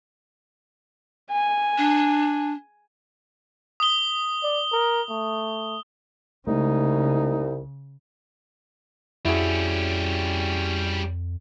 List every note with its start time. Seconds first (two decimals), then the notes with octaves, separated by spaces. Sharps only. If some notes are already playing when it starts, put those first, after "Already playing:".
1.31 G#5
1.78 D4
3.80 D#6 G7
4.43 D5
4.73 A#4
5.10 A3
6.47 C2 C#3 G#3 A3 D#4
9.25 F2 G3 C#4 E4 F#4 G#4